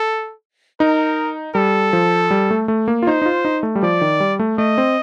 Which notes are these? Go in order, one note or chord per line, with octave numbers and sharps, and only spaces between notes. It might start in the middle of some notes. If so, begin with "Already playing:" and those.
Already playing: A4
D#4 A#4
G3 A4
F3
G3
A3
A3
A#3
F4
D#4 C5
D#4
F4
D#4
A3
G3
F3 D5
D#3
G3
A3
A3 D#5
C4